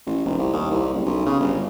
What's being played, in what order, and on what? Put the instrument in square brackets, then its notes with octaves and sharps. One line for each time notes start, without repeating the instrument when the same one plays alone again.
[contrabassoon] A1
F1
C2
D#2
C2
F#1
B1
C#3
G1